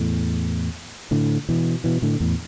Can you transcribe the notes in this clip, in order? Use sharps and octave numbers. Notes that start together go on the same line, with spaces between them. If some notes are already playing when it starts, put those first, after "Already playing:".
Already playing: E2 A2
A2 D3
B2 E3
B2 E3
A2 D3
E2 A2